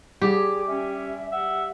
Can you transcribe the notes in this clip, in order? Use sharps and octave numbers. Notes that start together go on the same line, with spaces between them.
G3 G4 G#4
C#4 E5
E5 F#5